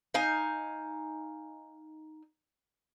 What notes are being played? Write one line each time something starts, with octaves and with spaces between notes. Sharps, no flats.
D#4 F5 G#5